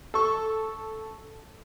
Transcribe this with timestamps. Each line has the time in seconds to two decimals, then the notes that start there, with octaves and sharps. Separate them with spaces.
0.14 A4 C#6